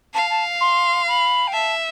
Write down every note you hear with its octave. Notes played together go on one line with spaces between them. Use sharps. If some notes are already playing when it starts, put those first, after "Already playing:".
F5 A5
A5
C6
B5
G5
E5 A5